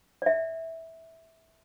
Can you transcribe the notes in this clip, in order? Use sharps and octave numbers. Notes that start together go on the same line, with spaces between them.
D5 E5